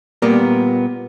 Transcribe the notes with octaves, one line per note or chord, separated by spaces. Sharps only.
A#2 G3 A#3 B3